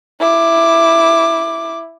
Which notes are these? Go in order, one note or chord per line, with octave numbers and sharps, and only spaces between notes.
E4 D6